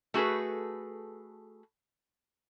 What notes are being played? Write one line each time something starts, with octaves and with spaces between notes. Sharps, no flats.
A3 F#4 G#4 A4 B4